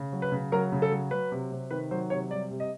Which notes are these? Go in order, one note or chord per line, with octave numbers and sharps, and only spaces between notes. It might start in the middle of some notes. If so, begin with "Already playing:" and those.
Already playing: C#3
F#3
B4
C#3
F#3 A#4
C#3
A4
F#3
F#3 B4
C3
C3
D#3 B4
F#3 C5
C3 C#5
G3 D5
C3
D#5